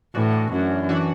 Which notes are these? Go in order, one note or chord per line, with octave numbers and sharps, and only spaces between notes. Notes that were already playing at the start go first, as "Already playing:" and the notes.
A2 E3 D4 F#4
F#2
E3 D4 F#4